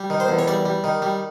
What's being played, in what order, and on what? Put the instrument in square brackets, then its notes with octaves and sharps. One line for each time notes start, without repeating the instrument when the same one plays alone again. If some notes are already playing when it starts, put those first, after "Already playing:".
Already playing: [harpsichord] G3
D#3
C5
E2
C#5
G3 D5
G3
D#3
G3